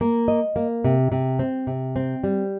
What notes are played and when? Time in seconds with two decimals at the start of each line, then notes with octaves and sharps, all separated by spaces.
0.01 A#3
0.28 D#5
0.56 A#3
0.84 C3
1.12 C3
1.39 C4
1.67 C3
1.96 C4
2.24 G3